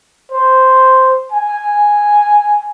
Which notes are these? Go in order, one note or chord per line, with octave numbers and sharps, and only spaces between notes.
C5
G#5